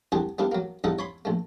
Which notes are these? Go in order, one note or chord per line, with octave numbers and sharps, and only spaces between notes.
C2 E3 D4 G4 G#4 F#5
G3 A#3 B3 D4 E4
F#3 A#3
E2 G2 D#4 A4 D#5 F#5
C#5 B5 C6
A#1 A3